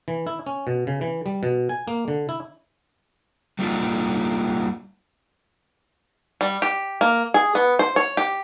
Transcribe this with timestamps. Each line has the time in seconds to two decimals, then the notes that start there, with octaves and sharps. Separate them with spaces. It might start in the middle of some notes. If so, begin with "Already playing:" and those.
0.08 E3
0.27 E4
0.46 C#4
0.67 B2
0.87 C#3
1.01 E3
1.26 G3
1.43 B2
1.69 G#5
1.88 A#3
2.08 D3
2.29 E4
3.59 G3 A3 A#3 D4 D#4 F4
6.41 G3
6.62 G4
7.01 A#3
7.34 G#4
7.55 B3
7.79 C5
7.96 C#5
8.17 G4